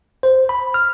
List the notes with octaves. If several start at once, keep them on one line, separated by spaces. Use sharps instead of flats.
C5
B5
F6